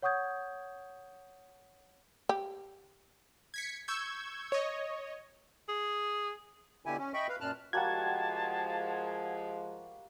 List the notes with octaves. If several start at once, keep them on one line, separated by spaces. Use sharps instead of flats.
C#5 F#5 C#6 D#6 G6 G#6
G4
G#6 B6 C#7
C#6 E6 G6 G#6
C#5 D#5
G#4
B2 D3 E4 G4 G#5
C#4
D#5 E5 G5 B5 C#6
B4 F5
F#2 A#2 A5 F6 F#6
F3 G3 G#3 A#3 F#4 F#5 A5 G#6